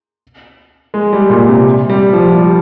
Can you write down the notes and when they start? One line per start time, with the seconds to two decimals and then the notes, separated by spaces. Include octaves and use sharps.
0.94 G#3
1.13 G3
1.30 A#2
1.49 C3
1.89 G3
2.13 F3
2.37 G3